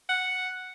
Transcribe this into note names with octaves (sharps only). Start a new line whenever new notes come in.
F#5